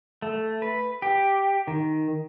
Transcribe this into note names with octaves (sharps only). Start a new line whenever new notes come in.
A3
B4
G4
D#3